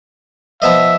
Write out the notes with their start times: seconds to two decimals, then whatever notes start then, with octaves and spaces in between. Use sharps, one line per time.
0.62 F3 B3 D#5 E5